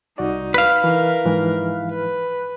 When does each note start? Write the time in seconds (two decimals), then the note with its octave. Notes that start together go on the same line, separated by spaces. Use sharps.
0.18 C2 D#4 F#4 D5
0.54 B4 F5
0.84 E3 A#4
1.25 G#2 E3 F3
1.92 B4